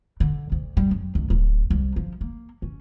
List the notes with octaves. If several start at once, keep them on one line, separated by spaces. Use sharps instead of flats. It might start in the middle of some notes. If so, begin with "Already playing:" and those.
D3
D2
G3
F#2
C#2
D1
C2
F3
A#3
C#4